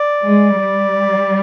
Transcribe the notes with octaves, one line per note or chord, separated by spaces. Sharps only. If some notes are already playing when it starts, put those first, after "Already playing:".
Already playing: D5
G#3
G3